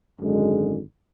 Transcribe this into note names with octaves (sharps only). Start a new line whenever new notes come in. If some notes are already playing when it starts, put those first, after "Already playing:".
G#1 F#2 D3 G#3